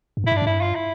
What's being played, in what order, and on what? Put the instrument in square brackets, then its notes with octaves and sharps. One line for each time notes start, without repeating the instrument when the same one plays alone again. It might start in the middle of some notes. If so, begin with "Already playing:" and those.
[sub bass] G2
A2
[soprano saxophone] E4
[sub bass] G2 [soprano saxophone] D4
[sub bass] A2
[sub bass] G2 [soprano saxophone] E4
[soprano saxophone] F4
E4